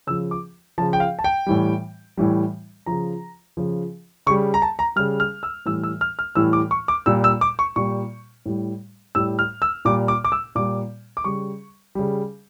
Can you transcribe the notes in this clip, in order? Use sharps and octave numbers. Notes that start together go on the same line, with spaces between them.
C#3 F3 E6
D6
C#3 F3 A5
G5
F5
A5
G5
A2 E3 G3
A2 E3 G3
C#3 F3 A#5
C#3 F3
C#3 G3 C#6
A#5
A5
A#5
C#3 G3 F6
F6
E6
A2 E3 G3 E6
E6
F6
F6
A2 E3 G3 E6
D6
C#6
D6
A#2 G3 E6
E6
D6
C#6
A#2 G3 C#6
A2 G3
A2 G3 E6
F6
E6
A#2 G3 D6
D6
D6
E6
A#2 G3 D6
D6
C#3 G3 C#6
C#3 G3